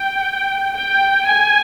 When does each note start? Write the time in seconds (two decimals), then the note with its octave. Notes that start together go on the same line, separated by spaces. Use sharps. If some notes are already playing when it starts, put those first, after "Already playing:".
Already playing: G5
0.74 G5
1.25 G#5